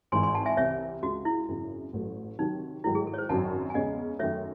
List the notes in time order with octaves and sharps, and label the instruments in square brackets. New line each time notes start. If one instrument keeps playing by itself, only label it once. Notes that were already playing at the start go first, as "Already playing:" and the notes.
[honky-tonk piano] G#1 G#2 E3 [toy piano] G#5 C6
[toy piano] G#5 C6
F#5 A5
E5 G#5
[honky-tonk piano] C2 C3 E3 C4 [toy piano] C#5 E5
[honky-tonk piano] C#2 C#3 G#3 [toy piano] F#4
[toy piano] E4
[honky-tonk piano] G#1 F#2 C#3
A1 A2 F#3 A3
[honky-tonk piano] C3 D#3 F#3 [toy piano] D#4
[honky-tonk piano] G#2 D#3 F#3 A3 [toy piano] E4
[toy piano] G#4
A4
C#5
C5
[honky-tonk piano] G#1 F#2 D#3 F#3 [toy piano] F#5 A5
[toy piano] G#5
[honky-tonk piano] E2 C#3 G#3 C#4 [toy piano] D#5 F#5
[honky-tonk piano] F#2 D#3 F#3 A3 [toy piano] C#5 E5